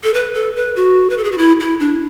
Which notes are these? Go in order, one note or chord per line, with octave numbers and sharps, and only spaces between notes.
A4
B4
A4
B4
F#4
B4
A4
G#4
F#4
E4
E4
D4